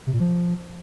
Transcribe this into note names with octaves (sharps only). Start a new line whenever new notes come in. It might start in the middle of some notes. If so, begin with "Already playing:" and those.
C3
A#2
F3